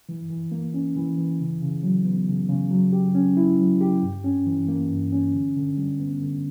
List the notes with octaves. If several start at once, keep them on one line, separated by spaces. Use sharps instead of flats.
E3
E3
A#3
C#4
E3
E3
C#3
C#3
F#3
B3
C#3
C#3
F#3
G4
C#4
E4
F#3
G4
G2
C#4
E3
A#3
G2
C#4
D3
D3
G3
B3
D3